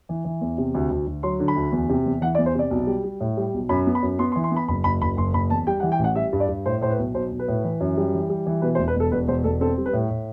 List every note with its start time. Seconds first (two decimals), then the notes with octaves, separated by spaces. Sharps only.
0.09 E3
0.25 E3
0.41 E2
0.58 C3
0.74 D2
0.90 D2
1.07 D2
1.23 F#3 C6
1.40 D3
1.48 B5
1.56 D2
1.72 E2
1.89 C3
2.06 E2
2.21 E3 F#5
2.35 D5
2.38 E2
2.46 C5
2.55 C3 D5
2.71 B1
2.87 G3
3.04 G3
3.20 A2
3.37 G3
3.53 B1
3.69 F#2 B5
3.87 B3
3.95 B5
4.02 F#2
4.19 B3 C6
4.32 C6
4.36 E3
4.44 C6
4.51 B3
4.56 B5
4.68 F#1 B5
4.84 F#1 B5
5.02 F#1 B5
5.17 F#1 C6
5.33 F#1 B5
5.50 E2 A5
5.67 G3 G5
5.80 F#5
5.83 E3
5.92 G5
5.99 A1 F#5
6.16 G3 E5
6.33 G2
6.40 D5
6.49 G2
6.65 A2 C5
6.81 A2 C5
6.90 B4
6.98 B1
7.14 B1 C5
7.31 B1
7.39 B4
7.48 A2
7.64 E3
7.80 F#2
7.97 G3
8.13 E3
8.30 G3
8.46 E3
8.62 B2 B4
8.75 C5
8.78 E1
8.88 B4
8.95 E1 A4
9.12 E1 B4
9.28 E1 C5
9.44 E1 A4
9.61 C4 A4
9.78 G3
9.86 B4
9.93 A2
10.10 A2